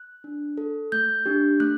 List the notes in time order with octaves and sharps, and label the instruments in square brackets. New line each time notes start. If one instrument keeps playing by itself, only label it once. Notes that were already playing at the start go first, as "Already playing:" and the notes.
Already playing: [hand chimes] F#6
D4
A4
A3 G6
D4 G4
A3 F#6